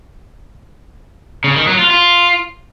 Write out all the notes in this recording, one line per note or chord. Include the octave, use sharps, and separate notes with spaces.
C#3
D#3
F#3
F4
F4